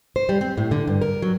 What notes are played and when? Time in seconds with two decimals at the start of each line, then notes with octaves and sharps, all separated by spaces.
0.16 C5
0.29 G3
0.41 C4
0.58 A2
0.71 D3
0.87 G2
1.01 A#4
1.22 F#3